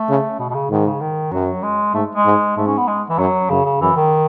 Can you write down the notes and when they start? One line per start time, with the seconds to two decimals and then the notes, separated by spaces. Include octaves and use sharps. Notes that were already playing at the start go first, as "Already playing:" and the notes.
Already playing: A3
0.09 C#3
0.39 B2
0.50 B2
0.55 C#3
0.70 G#2 D#3
0.86 C#3
1.01 D#3
1.32 F#2 F#3
1.63 G#3
1.94 G#2 A3
2.15 G#3
2.25 G#2
2.57 G#2 A3
2.67 C#4
2.78 B3
2.88 G#3
3.10 E3
3.19 F#2 F#3
3.50 F#2 C#3
3.65 C#3
3.81 F#2 E3
3.96 D#3